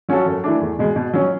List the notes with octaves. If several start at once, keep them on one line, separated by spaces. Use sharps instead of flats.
F#3 C#4 F#4 A4
F#2
E3 A3 D4
E2
B2 G#3
B2
F#3 C#4